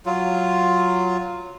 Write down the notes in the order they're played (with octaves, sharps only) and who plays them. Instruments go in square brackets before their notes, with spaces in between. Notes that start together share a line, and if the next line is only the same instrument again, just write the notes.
[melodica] F#3 F4